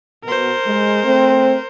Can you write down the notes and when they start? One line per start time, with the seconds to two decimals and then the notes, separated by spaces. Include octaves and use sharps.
0.24 B2 A#4 C5
0.66 G#3
1.04 A3 C4